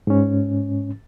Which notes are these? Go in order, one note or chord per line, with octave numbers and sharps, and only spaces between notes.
G#2 C#4